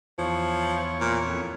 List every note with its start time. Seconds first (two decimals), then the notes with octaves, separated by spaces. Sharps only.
0.19 E2 F3 C#5
1.01 A#2
1.27 F2